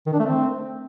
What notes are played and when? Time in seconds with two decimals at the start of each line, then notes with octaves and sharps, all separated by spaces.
0.07 D#3
0.13 D4
0.19 A3
0.26 C4